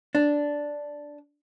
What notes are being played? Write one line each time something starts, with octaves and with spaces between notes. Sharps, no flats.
D4